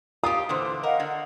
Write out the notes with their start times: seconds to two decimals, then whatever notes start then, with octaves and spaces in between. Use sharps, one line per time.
0.24 F4 G4 D#6
0.49 A#2 D3 E3 C5 C6 D6
0.83 A#4 D#5 F5 F#5
1.00 D3